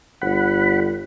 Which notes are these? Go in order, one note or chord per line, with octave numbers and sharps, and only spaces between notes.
G1 F#5 B5